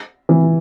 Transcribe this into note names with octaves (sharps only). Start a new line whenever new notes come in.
E3